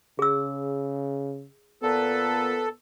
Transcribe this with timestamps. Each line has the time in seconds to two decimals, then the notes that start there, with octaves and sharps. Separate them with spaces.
0.19 C#3 G#4 E6
1.83 A#2 B3 A4 B4